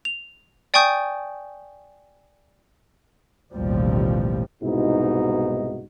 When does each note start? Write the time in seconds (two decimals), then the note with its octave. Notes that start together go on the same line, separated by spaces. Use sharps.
0.05 F7
0.74 D5 G5 G#5 C#6 D#6 G6
3.52 A1 D#2 B2 F3 G3
4.63 C2 G#2 B2 D#4 E4 F#4